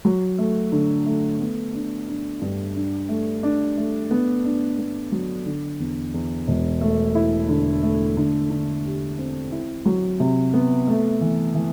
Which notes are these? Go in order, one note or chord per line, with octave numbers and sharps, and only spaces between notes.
F#3
A3
D3
A3
B3
D4
D4
G2
D4
A3
D4
A3
B3
D4
B3
F#3
D3
E2
E2
E1
A3
E4
D3
A3
D3
D3
G4
C4
E4
F#3
C3
B3
A3
E3
E3